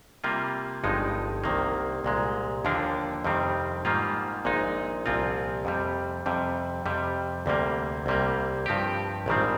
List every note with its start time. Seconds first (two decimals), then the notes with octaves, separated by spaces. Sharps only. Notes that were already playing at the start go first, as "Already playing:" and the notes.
0.24 C3 G3 A#3 F4
0.84 G1 G2 F3 G#3 D#4
1.44 C2 C3 D#3 A#3
2.04 C2 A#2 G#3
2.65 D#2 D3 F3 A#3 D4
3.24 F2 C3 D#3 G3 C4
3.85 G#2 D#3 G3 A#3 F4
4.45 A#1 A#2 G#3 D#4
5.06 C2 A#2 F3 C4 F4
5.65 F2 C3 G3
6.26 F2 C3 G3
6.86 F2 C3 G3
7.46 D2 C3 G3 A#3
8.06 C2 C3 G3 A#3
8.66 G2 F3 C4 G4
9.26 A#1 G#2 D#3 G3 C4